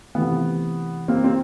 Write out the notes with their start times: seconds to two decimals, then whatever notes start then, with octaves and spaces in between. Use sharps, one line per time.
0.15 C3 E3 A3 B3
1.08 A#3 C4
1.24 C4